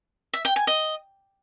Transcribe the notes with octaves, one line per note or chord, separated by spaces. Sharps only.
E5
G5
G#5
D#5